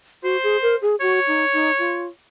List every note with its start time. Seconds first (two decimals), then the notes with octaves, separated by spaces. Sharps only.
0.23 F#4 C5
0.43 G#4
0.62 A#4
0.82 G#4
1.01 F#4 C#5
1.27 D#4
1.53 D#4
1.79 F4